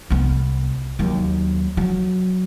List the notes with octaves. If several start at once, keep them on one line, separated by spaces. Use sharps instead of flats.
C2 B3
D#2 F#3
F#3